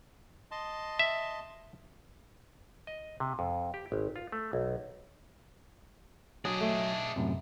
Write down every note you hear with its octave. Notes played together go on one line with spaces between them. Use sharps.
D#5 A5 C6
E5
D#5
C3
F2
G4
G#1
F4
A3
B1
F#3 D4 G#4 D#5
A3
F#2 A2 C3